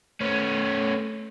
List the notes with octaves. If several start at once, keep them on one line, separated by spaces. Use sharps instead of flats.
A3 B3 C#4